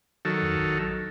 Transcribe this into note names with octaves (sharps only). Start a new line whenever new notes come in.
D#3 F#3 A4
F2
A1